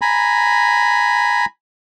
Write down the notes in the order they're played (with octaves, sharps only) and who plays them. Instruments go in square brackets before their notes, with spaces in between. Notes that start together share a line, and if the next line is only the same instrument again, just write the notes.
[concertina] G#5 A#5 B5